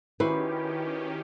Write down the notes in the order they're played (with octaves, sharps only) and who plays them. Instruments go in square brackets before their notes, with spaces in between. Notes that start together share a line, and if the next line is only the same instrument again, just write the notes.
[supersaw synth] D#3 C#4 G4 [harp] E4 F#4 C5 [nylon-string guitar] B4